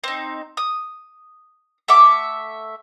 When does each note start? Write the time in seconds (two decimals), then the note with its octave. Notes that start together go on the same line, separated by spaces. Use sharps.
0.04 C4 D#4
0.57 D#6
1.88 A3 E5 F#5 D6